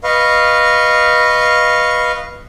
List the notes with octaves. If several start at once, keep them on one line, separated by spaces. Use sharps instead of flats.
B4 D#5 F5 C#6